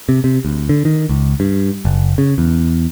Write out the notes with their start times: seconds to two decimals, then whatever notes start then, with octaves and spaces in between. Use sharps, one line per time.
0.09 C3
0.24 C3
0.45 D2
0.69 D3
0.85 D#3
1.09 C#2
1.40 G2
1.85 F#1
2.18 C#3
2.38 E2